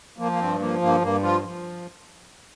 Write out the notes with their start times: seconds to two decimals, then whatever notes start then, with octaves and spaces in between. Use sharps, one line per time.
0.18 F3 A#3
0.32 A#3
0.39 G2 C4
0.60 F3 A#3
0.81 G2 A#3
1.02 G2 A#3
1.22 F3 F4
1.44 F3